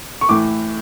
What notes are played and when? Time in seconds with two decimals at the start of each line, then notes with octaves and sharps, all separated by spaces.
0.21 C#6
0.29 A2 E3 D6